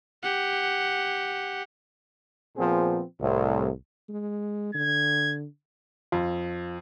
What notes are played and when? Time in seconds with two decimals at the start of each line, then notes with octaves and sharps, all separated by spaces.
0.23 G4 F#5
2.55 A#2 F3 B3 C4 G#4
3.20 C2 A2
4.09 G#3
4.74 D3 G#6
6.12 F2 F4